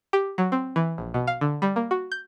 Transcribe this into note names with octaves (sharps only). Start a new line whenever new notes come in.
G4
F#3
C4
E3
A#1
B2
F5
D3
G3
A#3
F#4
G6